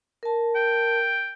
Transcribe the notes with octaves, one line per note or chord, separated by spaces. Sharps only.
A#4 A5
G5